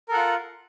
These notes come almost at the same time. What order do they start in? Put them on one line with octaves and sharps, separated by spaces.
A#4 A4 F#5 F4